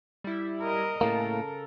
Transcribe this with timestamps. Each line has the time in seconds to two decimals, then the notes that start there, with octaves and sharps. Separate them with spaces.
0.24 G3 E4
0.62 A#4 D#5
1.01 A2 C#3 A#3 A4 A#4